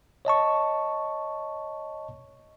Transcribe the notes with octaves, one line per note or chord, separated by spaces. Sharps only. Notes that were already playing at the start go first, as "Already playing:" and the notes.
C#5 D#5 A5 C#6